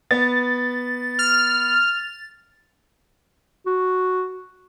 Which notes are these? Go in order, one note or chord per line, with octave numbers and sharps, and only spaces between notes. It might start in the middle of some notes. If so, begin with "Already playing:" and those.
B3 A6
F6
F#4